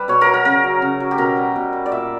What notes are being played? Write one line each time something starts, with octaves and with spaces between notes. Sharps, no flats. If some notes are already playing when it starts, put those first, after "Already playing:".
Already playing: G3 B4
B2 C#5
A#4
F#3
A#4
C#3 A#4
F#3
C#3
F#3
G4
B2 A#4
G3
B2
G3
D5
A#2 E5